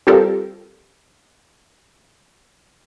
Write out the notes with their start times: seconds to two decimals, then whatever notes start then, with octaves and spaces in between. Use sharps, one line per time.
0.07 G3 C4 F4 G4 A4 A#4